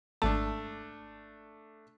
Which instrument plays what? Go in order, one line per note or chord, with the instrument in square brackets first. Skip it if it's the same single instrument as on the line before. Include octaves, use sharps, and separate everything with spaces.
[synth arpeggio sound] G#1 A5 [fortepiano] A3 D4